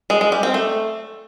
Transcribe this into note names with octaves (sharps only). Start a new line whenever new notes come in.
G#3
G#3
G3
C4
A3